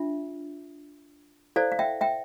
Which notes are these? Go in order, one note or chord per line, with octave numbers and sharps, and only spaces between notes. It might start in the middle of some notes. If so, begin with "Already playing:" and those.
Already playing: D4 F4 E5
E4 A4 C5 D5 F5
F5
E5 G5
E5 G5